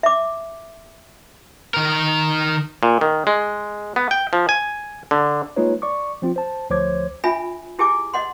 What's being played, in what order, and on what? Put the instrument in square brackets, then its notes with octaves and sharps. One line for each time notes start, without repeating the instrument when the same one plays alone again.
[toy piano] E5 D6
[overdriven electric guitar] D#3 A#4
[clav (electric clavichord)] A#2
D#3
G#3
B3
G5
F3
G#5
D3
[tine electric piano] G#3 A#3 D#4 F4 B4 C#5
D5 C#6 D6
F3 C4 F4
C5 A5
D2 F3 C5 C#5 D6 G#6
[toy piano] D4 F4 E5 G#5 B5
E4 G4 G#4 G#5 D6
D#5 F#5 C6